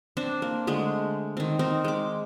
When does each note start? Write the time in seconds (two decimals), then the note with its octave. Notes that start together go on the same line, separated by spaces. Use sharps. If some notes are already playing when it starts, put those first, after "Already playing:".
0.17 C4 D4 C5
0.42 A#3
0.67 D3 G#3 A3
1.37 D#3 C4
1.59 C4 D#4 A#4
1.84 G#3 D6